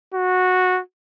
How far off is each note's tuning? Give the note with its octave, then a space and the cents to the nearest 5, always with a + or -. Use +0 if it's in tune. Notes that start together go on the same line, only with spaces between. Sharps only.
F#4 -15